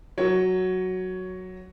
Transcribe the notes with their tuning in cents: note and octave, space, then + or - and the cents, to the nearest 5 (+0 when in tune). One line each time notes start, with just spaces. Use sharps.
F#3 +0 A#4 +0 C#5 +10